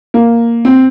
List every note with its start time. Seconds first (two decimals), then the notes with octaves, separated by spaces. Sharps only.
0.14 A#3
0.65 C4